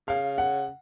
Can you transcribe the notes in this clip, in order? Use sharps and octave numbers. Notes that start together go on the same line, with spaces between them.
C#3 F5
F#5